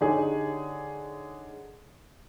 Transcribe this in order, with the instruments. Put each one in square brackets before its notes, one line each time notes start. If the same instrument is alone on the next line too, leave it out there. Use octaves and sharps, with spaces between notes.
[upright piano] D3 D#4 G4 G#4 C#5